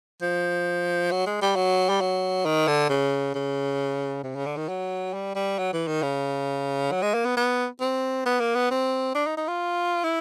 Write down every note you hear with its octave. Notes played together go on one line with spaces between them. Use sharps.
F3
F#3
G#3
G3
F#3
G3
F#3
D#3
D3
C#3
C#3
C3
C#3
D3
D#3
F#3
G3
G3
F#3
E3
D#3
C#3
F#3
G#3
A#3
B3
B3
C4
B3
A#3
B3
C4
D4
D#4
D#4
F4
E4